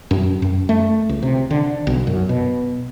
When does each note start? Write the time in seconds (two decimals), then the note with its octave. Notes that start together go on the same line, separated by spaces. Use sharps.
0.11 F#2
0.42 F#2
0.69 A3
1.09 C#2
1.23 C3
1.50 D3
1.87 B1
2.07 F#2
2.29 B2